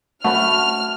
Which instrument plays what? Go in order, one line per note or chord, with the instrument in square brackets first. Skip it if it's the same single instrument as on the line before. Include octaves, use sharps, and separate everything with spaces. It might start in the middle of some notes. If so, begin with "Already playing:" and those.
[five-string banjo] A3 B5 [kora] F#4 [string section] F6